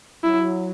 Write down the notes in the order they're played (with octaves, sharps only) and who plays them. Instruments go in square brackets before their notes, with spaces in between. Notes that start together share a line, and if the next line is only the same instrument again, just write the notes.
[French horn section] F#3 [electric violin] E4